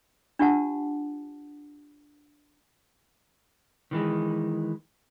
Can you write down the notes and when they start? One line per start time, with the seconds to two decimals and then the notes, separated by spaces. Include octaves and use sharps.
0.39 D4 F4 G4 F#5 A5
3.91 D#3 E3 G#3